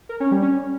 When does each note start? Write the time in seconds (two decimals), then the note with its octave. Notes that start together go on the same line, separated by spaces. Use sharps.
0.09 A#4
0.20 C#4
0.31 G3
0.42 C#4